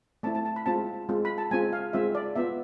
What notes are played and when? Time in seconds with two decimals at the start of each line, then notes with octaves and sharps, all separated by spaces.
0.23 A3 C4 E4 A5
0.35 A5
0.45 A5
0.56 B5
0.66 G#3 C4 F4 A5
1.09 G#3 C4 F4
1.25 B5
1.38 A5
1.51 G#3 C4 F4 G#5
1.73 F5
1.93 G#3 C4 F4 E5
2.15 D5
2.36 B3 F4 E5